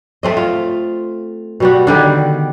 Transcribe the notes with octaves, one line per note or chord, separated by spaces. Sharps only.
A3 C4 D#5
F4
B2 G3 F#4
D3 D#3 G3